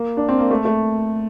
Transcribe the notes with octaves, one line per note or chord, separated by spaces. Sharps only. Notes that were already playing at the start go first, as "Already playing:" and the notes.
Already playing: A#3
D4
C4
A#3
A3
A3